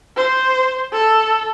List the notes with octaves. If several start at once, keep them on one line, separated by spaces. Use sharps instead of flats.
C5
A4